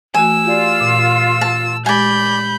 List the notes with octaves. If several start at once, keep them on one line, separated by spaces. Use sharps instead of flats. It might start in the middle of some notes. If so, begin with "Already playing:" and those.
E3 A3 F#4 G#5 E6
F4 G4 D5
A#2
A5
G#3 G4 D5 G#5 B5 G6